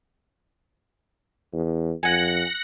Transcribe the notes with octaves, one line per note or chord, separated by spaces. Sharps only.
E2
F2 F#5 G#5 F#6 A#6 C#7